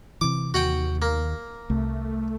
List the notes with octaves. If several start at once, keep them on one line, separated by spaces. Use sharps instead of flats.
C3 E3 D6
D#2 F#4 F#5 G5
A#3
C2 A3